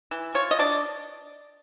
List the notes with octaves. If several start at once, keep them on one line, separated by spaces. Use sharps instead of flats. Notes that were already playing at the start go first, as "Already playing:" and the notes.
E3
F4 C#5
D#5
D4 D5